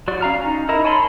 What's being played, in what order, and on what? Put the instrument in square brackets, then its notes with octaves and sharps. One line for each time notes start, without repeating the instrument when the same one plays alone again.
[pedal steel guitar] F#3 F#4 D5
C#4 F5 A#5 F6
D#4
E4 A#4 D#5 A#5
C#5 G#5 A5 B5 C6